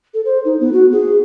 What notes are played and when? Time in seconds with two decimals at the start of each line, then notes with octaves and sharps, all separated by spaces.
0.14 A4
0.25 C5
0.45 D#4
0.60 B3
0.73 F#4
0.92 G#4